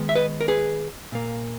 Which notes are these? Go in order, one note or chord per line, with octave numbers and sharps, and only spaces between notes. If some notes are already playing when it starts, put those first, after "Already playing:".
Already playing: D#3 G#3 B3
E5
B4 D#5
A#4
G#4 B4
A#2 A#3